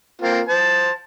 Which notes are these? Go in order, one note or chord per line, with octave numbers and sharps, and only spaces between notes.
A#3 C4 F4
C5 A5